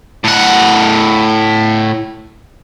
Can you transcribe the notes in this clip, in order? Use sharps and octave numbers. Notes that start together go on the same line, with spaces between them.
A2 F#5